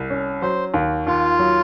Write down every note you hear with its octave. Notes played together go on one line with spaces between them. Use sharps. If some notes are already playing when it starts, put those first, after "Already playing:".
Already playing: C2
C#4
F#3 C5
D#2
D#2 F4
F#3